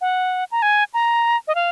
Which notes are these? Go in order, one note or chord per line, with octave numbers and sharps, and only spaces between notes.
F#5
A#5
G#5
A#5
D#5
F5